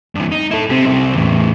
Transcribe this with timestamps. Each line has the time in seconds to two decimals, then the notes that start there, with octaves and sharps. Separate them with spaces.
0.15 G2 E3
0.32 D#4
0.51 E4 A4
0.70 C4 G4
0.85 C2 C4
1.15 E2 A2